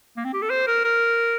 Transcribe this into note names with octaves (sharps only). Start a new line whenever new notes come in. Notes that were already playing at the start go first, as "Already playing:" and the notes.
A#3
C4
G4
A4
C5
A#4
A#4